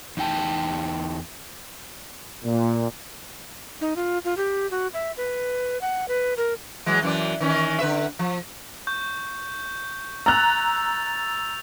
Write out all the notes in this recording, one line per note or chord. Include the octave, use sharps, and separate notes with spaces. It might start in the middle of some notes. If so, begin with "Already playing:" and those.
E2 D#4 G5 A5
A#2
D#4
F4
F4
G4
F#4
E5
B4
F#5
B4
A#4
E3 F#3 G#3
F#2 E3 D5
D#3 E3 C#4
D3 B4 E5
F3
C#6 G6
A#5 E6 F#6 A6 F7